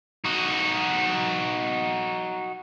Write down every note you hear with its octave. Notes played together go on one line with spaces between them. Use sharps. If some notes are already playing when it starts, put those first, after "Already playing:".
D#4 F#4